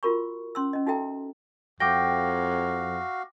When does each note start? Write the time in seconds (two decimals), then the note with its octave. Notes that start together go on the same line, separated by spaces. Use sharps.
0.03 F4 F#4 A#4 B5 C#6
0.55 C#4 C6 E6
0.73 C#4 D#5
0.86 D#4 F#4 A4 E5 G5 A#5
1.80 F2 F#4 F5 G5 D6 A#6